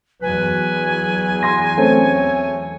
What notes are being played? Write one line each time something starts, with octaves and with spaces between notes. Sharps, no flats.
E2 F#3 B4 G#5
C6 A#6
A3 C4 C#4 C#5